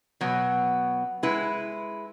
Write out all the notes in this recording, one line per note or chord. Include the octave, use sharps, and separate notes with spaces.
B2 F#3 B3
G#3 E4 B4